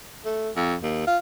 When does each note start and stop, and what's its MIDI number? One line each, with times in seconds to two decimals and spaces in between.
0.25 0.50 57
0.56 0.76 41
0.83 1.07 39
1.07 1.18 65